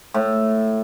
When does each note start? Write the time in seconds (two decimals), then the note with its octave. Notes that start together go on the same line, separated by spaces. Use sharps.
0.14 A2